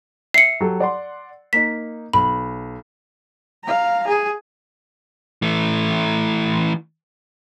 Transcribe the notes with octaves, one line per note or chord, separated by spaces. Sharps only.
E5 C7 C#7
F#3 G4 A4
D5 F#5 C6
A#3 D#4 B6
B1 B5
F5 A#5
G#4
E3 A3